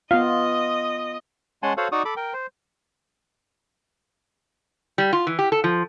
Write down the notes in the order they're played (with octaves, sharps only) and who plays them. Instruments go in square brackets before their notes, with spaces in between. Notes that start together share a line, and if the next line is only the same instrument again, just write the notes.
[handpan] B3 F4 [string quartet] D#5 [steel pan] F5
[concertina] G#3 C#4 F#5 G#5 A5 C6
F#4 A4 C5 C#5 F5 F#5
D#4 F#4 D5 C#6 D#6
A4 B5 D6
A#4 G5
C5
[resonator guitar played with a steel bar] G3
F4
E3
G4
A4
F3